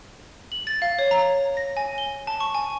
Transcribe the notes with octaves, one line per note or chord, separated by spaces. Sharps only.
F#7
A6
F5
C#5
A#5
A#6
G#5
G7
A5
C#6
G#5